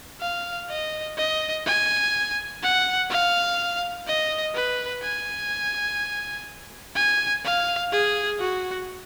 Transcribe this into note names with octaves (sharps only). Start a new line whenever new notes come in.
F5
D#5
D#5
G#5
F#5
F5
D#5
B4
G#5
G#5
F5
G#4
F#4